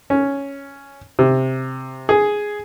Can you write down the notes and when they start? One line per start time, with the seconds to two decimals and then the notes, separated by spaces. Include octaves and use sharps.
0.10 C#4
1.19 C3
2.09 G#4